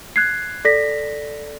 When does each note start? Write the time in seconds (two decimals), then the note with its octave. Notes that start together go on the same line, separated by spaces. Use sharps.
0.16 F#6 G#6 C7
0.65 A4 D5 A#6 B6